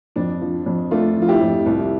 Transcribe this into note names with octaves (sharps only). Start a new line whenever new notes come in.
F2 D4
F3
F2
A3 D4 F4
F3
F4
E4 G4
F2
C2